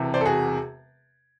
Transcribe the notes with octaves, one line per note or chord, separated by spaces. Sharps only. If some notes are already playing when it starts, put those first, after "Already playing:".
Already playing: E1 E2 C3
C5 D5
A4
F#4 G#4